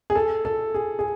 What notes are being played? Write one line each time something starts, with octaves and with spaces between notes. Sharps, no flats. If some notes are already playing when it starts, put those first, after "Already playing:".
G#4
A4
A4
G#4
G#4